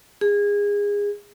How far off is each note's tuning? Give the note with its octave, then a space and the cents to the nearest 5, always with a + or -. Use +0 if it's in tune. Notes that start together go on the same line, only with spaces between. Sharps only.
G#4 -25